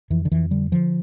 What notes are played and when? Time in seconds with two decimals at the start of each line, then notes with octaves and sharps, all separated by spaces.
0.10 F2 E3
0.25 D3
0.31 F2 E3
0.51 D3 G3
0.72 D3 F3